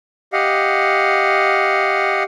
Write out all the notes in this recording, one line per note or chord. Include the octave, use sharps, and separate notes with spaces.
G4 D#5 F5 F#5